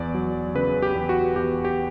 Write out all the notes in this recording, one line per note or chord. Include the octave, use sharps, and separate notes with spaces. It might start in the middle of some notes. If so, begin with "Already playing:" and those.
Already playing: E2 D5
F#3
C#3 B4
G4
E2
F#4
E2 G4
G4